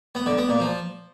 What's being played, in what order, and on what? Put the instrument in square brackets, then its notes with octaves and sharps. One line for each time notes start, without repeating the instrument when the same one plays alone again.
[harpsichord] B3
D3
B3
A#2
F3